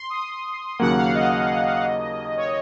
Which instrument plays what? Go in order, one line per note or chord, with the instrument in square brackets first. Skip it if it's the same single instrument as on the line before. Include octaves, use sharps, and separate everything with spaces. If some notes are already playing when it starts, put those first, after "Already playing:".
Already playing: [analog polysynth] C6
D#6
[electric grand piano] D#2 C#3 F#3 A#3 [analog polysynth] F#5
[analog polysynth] F5
D#5
C#5